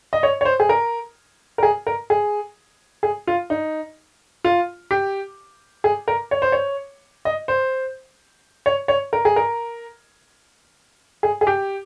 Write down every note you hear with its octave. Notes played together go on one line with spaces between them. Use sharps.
D#5
C#5
C#5
C5
G#4
A#4
A#4
G#4
A#4
G#4
G#4
F4
D#4
F4
G4
G#4
A#4
C#5
C5
C#5
D#5
C5
C#5
C#5
A#4
G#4
A#4
G#4
G#4
G4